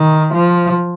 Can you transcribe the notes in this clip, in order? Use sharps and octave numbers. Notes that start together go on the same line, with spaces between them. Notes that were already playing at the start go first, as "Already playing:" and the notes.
Already playing: D#3
F3